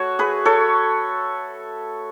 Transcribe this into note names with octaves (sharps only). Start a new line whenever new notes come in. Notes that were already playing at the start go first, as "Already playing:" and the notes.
Already playing: A3 F#4 C#5
G#4 B4
A4 C#5